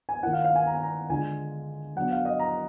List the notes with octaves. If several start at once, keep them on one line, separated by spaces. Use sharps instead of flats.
G#5
D#3 A#3 F4 F#5
F5
F5
G#5
A#5
G#5
A#5
D3 G#3 D4 F4 G#5
F#3 B3 D4 F#5
F5
D#5
A#5